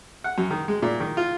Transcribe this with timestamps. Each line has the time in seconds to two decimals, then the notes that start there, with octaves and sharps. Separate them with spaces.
0.24 F#5
0.38 F#2
0.51 D#3
0.68 G#3
0.82 A#2
1.00 D#3
1.17 F4